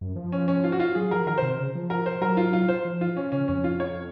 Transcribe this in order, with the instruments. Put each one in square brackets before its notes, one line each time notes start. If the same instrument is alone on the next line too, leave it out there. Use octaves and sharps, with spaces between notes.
[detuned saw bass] F#2
F3
[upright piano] C#4
C#4
F4
F#4
F4
[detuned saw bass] F#3 [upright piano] G#4
[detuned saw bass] F3 [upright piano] A#4
[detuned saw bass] D#3 [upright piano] A#4
[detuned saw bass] C3 [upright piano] C5
[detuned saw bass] C#3
F3
[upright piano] A#4
C5
[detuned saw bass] F#3 [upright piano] A#4
[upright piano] F4
F4
C5
[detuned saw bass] F3
[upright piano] F4
C#4
[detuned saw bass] C#3 [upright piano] C#4
[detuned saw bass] F2 [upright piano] C#4
[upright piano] F4
C#5